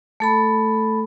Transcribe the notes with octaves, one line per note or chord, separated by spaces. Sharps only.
A3 A4 B5